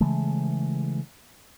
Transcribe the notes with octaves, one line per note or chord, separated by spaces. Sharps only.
C#3 E3 G#3 A3